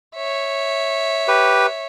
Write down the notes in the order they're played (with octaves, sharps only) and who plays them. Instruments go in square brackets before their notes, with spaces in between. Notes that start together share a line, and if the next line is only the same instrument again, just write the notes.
[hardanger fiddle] C#5 E5
[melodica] G4 B4